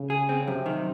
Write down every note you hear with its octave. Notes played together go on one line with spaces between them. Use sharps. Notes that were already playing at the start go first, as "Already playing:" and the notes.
Already playing: C#3
G#4
C4
F#2 C3
D#3